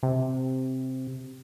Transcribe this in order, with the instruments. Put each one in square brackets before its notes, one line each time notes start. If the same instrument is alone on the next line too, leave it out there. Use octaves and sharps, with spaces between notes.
[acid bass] C3